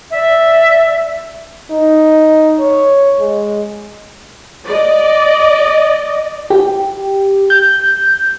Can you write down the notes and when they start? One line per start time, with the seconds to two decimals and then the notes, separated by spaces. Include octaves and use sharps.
0.12 D5 E5
1.70 D#4
2.59 C#5
3.19 G#3
4.65 D5 D#5
6.50 G4
7.50 G6